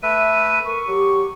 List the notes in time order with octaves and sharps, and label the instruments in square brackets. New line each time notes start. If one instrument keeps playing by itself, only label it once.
[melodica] A3 B4 E5 [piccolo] D#7
[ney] A#4 [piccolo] C#6
[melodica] F#3 [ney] G4